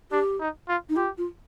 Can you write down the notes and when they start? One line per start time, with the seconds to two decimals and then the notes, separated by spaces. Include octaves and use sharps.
0.11 D4 G4
0.40 D#4
0.68 F4
0.89 D#4
0.96 F4 G4
1.18 F4